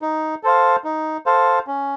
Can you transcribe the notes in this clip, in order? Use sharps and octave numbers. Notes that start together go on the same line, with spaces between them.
D#4
A4 C5 F5
D#4
A4 C5 F5
C#4